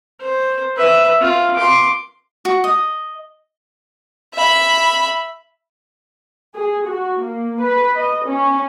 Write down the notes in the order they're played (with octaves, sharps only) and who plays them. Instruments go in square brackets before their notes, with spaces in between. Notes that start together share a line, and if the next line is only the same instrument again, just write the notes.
[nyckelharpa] C5
B4 E5
F4
C6 D6
[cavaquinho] F#4
D#5
[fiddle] E5 B5
[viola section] G#4
F#4
A#3
B4
D#5
C#4